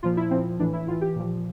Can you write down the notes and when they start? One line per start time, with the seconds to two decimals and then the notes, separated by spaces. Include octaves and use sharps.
0.03 A#2 F3 F4
0.17 E4
0.31 A#2 F3 C4
0.59 A2 E3 D4
0.73 E4
0.87 A2 F4
0.91 E3
1.01 G4
1.16 A#2 F3